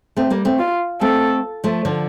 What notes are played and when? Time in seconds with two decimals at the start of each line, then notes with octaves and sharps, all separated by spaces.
0.17 A3 C4
0.30 G3 A#3
0.45 A3 C4
0.59 F4
1.01 A3 C4 A4
1.64 F3 A3
1.85 D3 F3